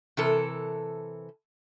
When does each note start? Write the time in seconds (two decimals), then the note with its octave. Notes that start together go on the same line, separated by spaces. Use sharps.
0.17 C3 E3 A4 A#4